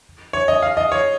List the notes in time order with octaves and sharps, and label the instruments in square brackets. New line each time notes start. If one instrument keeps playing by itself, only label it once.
[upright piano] C#5
D#5
F5
D#5
C#5